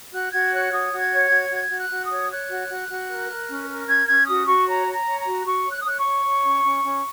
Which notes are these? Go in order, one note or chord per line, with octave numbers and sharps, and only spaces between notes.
F#4 F#6
F#4 G#6
C#5 F#6
F#4 D#6
F#4
G#6
C#5
G#6
F#4
F#4 G#6
F#4
F#6
F#4
D#6
C#5
C#5 F#6
F#4
F#4
F#4
A#4
A#4
C#4
A#4
C#4 G#6
C#4 G#6
F#4 D#6
F#4 C#6
C#5 A#5
C#5
A#5
C#5
A#5
F#4
F#4 C#6
C#5
F#6
D#6
C#5 F#6
C#6
C#5
C#5
C#4
C#4
C#4